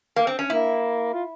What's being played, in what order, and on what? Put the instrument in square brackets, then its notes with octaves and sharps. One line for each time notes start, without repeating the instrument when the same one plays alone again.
[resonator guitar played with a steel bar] A#3
C4
C#4
[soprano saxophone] A#3 [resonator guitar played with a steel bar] E4
[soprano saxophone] F4